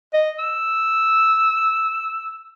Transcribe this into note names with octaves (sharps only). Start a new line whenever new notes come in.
D#5
E6